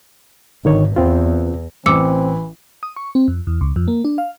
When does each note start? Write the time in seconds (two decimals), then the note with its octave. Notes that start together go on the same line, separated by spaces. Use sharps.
0.65 G#1 D3 D#3 C#5
0.96 E2 B3 C4 F4
1.86 A1 E3 C4 D6 E6 C#7
2.83 D#6
2.96 C#6
3.15 C4
3.28 F2
3.47 E2
3.61 C#2
3.76 F2
3.88 A#3
4.05 D4
4.18 F5